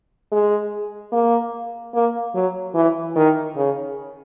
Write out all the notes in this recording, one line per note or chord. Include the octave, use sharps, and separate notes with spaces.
G#3
A#3
A#3
F#3
E3
D#3
C#3